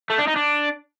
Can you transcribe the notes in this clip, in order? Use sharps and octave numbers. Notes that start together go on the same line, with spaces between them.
A3
D4
D#4
D4